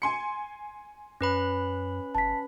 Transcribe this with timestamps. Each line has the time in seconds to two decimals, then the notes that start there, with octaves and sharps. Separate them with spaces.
0.02 G#5 C6 C#7
1.21 F#2 C#4 B4 B5
2.15 G1 A5 B6